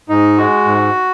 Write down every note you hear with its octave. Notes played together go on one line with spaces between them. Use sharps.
G#2 D#4
G#3 F#4
G#2